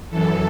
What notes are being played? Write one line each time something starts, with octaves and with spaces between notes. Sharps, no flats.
F#2 E3 A4